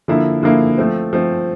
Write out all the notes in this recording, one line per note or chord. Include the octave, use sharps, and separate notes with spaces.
D3 F3 A#3 E4
D3 F3 A#3 E4
F3 A3 C4
F3 A3 C4